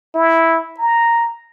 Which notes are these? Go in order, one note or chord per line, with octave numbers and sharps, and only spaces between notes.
E4
A#5